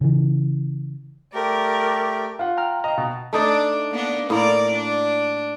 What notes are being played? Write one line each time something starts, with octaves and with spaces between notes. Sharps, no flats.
C#3 E3
A3 G4 A#4 D5
F4 F#5
G5 A#5 F6
D#5 F5 G5 A#5
B2
A3 D4 D#4 D5
A#3 B3 D4
A2 A#3 A#4 D5
D4